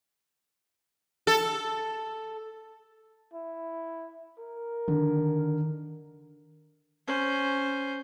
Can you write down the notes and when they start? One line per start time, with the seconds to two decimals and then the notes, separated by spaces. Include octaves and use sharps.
1.27 A4
3.33 E4
4.39 A#4
4.88 D3 D#3
7.07 C#4 C5